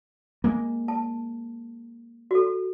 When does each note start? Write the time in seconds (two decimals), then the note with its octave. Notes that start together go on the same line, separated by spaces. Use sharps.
0.44 G#3 A#3
0.88 A5
2.31 F#4 A4